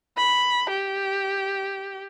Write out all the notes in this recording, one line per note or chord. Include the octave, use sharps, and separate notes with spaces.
B5
G4